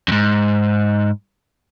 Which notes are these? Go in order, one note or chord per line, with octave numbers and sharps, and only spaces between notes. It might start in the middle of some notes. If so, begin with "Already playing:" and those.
F2 G#2